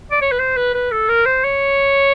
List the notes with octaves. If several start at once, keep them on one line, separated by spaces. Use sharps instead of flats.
D5
C#5
B4
C5
B4
B4
A4
A#4
C5
C#5